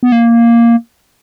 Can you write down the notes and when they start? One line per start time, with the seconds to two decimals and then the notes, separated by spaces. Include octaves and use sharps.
0.03 B3
0.12 A#3